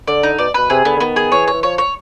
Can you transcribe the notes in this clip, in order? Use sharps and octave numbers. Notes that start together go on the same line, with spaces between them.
D3 D5
D#4
B2 D5
B2 B4
C3 G#4
D3 B3
D3
D#3 B3
G#4
E3 C#5
C#5
E3
F3 C#5
C#5